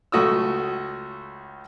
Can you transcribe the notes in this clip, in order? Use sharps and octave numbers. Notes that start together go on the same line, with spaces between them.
C#2 A3 F#4 D#6 E6